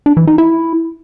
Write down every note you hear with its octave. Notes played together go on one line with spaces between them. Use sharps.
D4
E3
D#4
E4